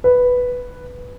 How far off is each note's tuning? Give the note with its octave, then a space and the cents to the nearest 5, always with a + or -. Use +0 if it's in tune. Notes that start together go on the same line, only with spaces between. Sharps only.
B4 +0